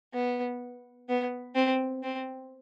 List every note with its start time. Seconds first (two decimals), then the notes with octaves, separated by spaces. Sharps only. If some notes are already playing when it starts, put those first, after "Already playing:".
0.14 B3
1.09 B3
1.55 C4
2.03 C4